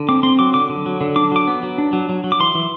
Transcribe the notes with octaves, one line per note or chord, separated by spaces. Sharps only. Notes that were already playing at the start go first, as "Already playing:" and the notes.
Already playing: D3
C4 D6
C4 C6
F#3 D6
D3 D6
D3
F#3
D3
D4 D6
F#3 D6
B3
F#3
D4
F#3
F#3
F#3
D6
E3 C6
E3